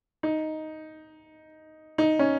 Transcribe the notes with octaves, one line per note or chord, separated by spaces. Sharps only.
D#4
D#4
C#4